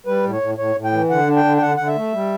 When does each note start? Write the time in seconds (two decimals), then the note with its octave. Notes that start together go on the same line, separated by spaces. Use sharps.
0.06 G3 B4
0.24 A2
0.33 C#5
0.41 A2
0.58 A2 C#5
0.75 A2
0.84 G5
0.93 E3
1.10 D3 F#5
1.28 D4
1.36 G5
1.44 D3
1.57 G5
1.62 D3 F#5
1.77 D3 F#5
1.87 E5
1.96 A3
2.13 G3